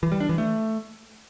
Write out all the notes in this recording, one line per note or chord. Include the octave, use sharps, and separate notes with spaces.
E3
G3
D4
E3
A3